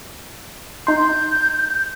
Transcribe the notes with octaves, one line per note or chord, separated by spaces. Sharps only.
D#4 C6 G6